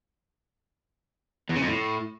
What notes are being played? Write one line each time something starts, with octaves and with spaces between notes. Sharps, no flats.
E2
C#3
F2
A2